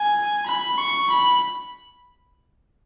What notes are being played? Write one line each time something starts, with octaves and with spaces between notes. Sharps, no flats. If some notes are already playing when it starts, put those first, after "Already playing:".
Already playing: G#5
B5
C#6
B5